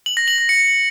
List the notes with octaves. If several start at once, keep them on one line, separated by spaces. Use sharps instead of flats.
F#7
A#6
F#7
A#6
C#7